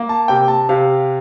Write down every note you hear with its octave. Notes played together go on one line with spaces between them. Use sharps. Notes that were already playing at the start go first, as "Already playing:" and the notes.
Already playing: A#3
A5
C3 G5
A5
C3 F5